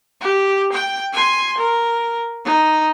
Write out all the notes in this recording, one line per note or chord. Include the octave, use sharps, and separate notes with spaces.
G4
G5
G#5 C6
A#4
D#4